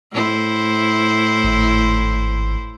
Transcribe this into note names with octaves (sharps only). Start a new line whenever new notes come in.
A2 E4 C5
G#1